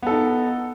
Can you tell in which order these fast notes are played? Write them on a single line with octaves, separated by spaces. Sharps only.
B3 A4 D#4